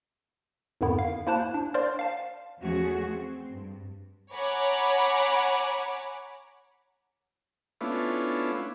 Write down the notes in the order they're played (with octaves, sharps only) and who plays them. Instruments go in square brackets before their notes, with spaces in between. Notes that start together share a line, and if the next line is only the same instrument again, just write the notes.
[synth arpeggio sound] F2 G#2 D3 D#3 B3 E4
F5
A#3 E4 C5 A5 F#6 E7
D4
A#4 C5 D5 F5 C6 A6
F5 A5
[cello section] E2 F3 A3 C#4 F#4 G#4
C4
G2
[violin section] C#5 F#5 G#5 A#5 B5 D6
[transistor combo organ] A3 B3 C#4 D4 E4 F4